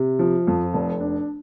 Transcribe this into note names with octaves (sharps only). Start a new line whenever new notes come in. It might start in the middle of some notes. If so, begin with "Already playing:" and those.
Already playing: C3
F3
F2
F1
D4